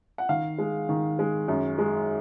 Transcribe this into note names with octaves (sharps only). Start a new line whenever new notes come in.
F#5
D#3 F5
G#3
D#3
G#3
F#2
G#3